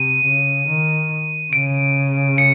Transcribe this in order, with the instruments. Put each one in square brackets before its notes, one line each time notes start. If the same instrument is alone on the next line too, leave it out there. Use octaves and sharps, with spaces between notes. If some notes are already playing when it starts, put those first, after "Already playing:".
Already playing: [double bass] C3 [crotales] D#7
[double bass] C#3
D#3
[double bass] C#3 [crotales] D7
[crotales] C#7